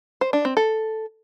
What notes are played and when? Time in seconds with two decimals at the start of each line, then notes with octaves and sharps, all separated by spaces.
0.21 C5
0.33 D4
0.45 C4
0.57 A4